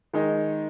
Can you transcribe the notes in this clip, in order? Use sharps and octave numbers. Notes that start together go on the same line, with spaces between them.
D#3 G#3 D#4